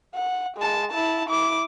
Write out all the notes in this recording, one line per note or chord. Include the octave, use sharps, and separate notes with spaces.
F#5
G#3 A5
E4 A5
E4 D6